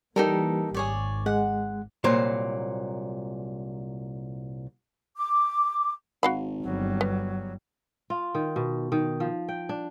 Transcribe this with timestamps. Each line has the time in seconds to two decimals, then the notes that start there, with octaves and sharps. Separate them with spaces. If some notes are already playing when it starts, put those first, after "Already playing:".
0.16 E3 G3 A#3 D#4 G4 A4 A#4
0.74 G#1 G#4 C#5 D5
1.26 G#3 F#5
2.04 C2 A#2 F#3 C5
5.16 D6
6.23 G#1 F#4 F5 B5
6.63 G1 F#3 G3
7.01 B3
8.10 F4
8.35 D#3
8.56 B2
8.92 D#3
9.20 F3
9.49 G5
9.69 D4